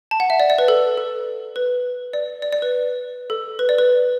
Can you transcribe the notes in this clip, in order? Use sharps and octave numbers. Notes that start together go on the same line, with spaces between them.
A5
F#5
E5
D5
D5
B4
A4
A4
B4
D5
D5
D5
B4
A4
B4
D5
B4